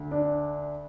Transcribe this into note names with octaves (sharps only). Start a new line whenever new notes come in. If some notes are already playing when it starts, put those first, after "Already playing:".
Already playing: D2
D4